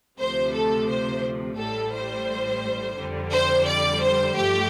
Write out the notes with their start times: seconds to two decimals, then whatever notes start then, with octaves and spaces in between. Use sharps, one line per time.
0.18 D2 C3 F3 A3 C5
0.53 A4
0.87 C5
1.57 A1 A2 G3 A4
1.92 C5
2.97 F2 D3 G3
3.32 C5
3.67 D5
4.01 C5
4.35 G2 F3 A3 G4